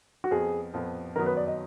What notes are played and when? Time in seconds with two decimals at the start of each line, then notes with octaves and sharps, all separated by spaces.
0.24 F#4
0.31 F2 F3 B3 G#4
0.74 F2 F3 B3
1.16 F#2 D#3 F#3 B3 D#4 A#4
1.26 B4
1.37 D5
1.47 D#5